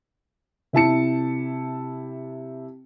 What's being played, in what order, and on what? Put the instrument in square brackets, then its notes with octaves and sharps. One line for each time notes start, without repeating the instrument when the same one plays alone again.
[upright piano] C3 E4 A5 C#7